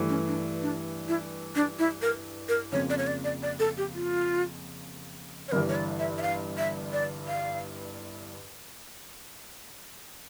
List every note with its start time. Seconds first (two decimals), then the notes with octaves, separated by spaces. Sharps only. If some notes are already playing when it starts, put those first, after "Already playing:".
Already playing: G2 E3 A3
0.09 C#4
0.27 D4
0.62 D4
1.08 E4
1.55 D4
1.79 E4
2.02 A#4
2.49 A#4
2.72 F2 C#3 F3 A#3 C#5
2.90 D5
2.98 C#5
3.07 D5
3.24 D5
3.43 D5
3.59 A4
3.78 G4
3.95 F4
5.48 C#5
5.52 G1 G2 E3 A#4
5.69 C#5
5.75 D5
5.99 E5
6.18 E5
6.22 F5
6.58 E5
6.93 D5
7.27 F5